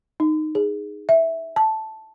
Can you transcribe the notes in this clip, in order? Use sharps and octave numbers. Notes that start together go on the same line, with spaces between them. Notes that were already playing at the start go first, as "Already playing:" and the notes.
D#4
G#4
E5
A5